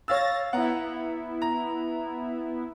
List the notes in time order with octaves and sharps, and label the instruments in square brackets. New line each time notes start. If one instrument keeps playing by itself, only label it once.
[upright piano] C#5 F5 E6 [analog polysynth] A6 A#6
[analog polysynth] B3 E4 [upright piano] F#5 A#5
[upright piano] A#5